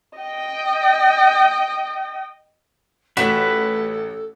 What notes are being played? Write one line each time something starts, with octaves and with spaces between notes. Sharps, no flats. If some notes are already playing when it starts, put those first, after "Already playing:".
D#5 G5
A1 F#4 A4 B4 B6 E7